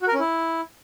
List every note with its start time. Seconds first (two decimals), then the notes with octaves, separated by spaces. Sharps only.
0.02 F#4
0.08 A#4
0.14 C#4
0.20 E4